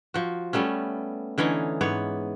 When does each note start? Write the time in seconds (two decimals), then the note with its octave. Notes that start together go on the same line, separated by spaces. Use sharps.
0.14 F3 F#4
0.53 G3 A3 B3 C#4
1.38 D3 E3 C#4 D#4
1.81 G#2 B3 C#5